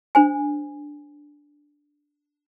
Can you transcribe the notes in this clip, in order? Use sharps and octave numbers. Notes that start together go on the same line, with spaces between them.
D4 C5 G#5